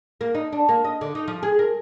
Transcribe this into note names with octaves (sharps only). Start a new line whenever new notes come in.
A#3
D#4
D4
A#3
D#5
D3
D#4
F3
G#4
A#4